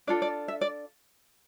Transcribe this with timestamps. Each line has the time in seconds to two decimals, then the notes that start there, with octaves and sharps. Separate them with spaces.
0.07 D4 F4 A4 D5
0.22 D5
0.48 E5
0.61 D5